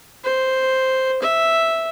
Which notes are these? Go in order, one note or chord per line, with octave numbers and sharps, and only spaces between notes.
C5
E5